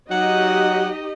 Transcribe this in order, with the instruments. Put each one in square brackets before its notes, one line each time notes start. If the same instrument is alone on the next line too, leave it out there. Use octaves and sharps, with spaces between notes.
[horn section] F#3 F#5 [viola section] D#4 G4 D#5